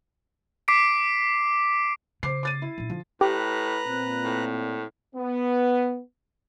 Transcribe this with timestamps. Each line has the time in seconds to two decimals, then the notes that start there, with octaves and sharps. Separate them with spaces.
0.68 D6 B6 C7 D7
2.23 C#3 C5 D6 C7
2.43 D6 A6 D#7
2.62 E4
2.78 A#2 D#4
2.90 D3 F3
3.21 A2 G4 B4 A#5 F#6
3.87 A#2 C4
4.24 A2
5.15 B3